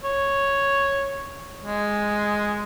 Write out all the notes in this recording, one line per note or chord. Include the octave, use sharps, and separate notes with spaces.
C#5
G#3